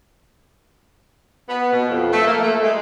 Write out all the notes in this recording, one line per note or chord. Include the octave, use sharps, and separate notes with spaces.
B3
B2
F2
A3
A#3
A3
G#3